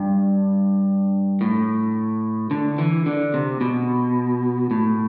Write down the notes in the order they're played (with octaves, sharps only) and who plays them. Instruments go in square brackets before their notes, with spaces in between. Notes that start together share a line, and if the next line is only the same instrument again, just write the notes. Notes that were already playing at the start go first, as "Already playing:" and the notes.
Already playing: [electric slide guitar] G2
A2
D3
E3
D3
C3
B2
A2